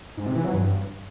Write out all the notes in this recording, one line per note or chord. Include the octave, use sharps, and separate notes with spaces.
G#2
C3
E3
F#3
G2